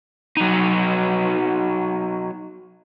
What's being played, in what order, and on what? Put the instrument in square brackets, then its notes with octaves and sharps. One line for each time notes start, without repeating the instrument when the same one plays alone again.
[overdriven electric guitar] F#3 D#4